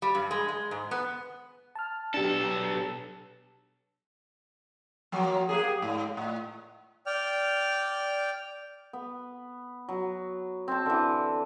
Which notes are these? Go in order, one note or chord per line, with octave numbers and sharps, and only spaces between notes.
G3
G2
G#3
G#3
G#2
B3
A5 F6
B1 D4 G4 A4
F3 F#3 A#3
A#3 G4 G#4
G#2
A2
D5 G5 F6
B3
F#3
C4 A5
D3 E3